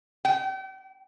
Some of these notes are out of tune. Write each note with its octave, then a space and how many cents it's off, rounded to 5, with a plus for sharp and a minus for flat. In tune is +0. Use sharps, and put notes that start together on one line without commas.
G5 -40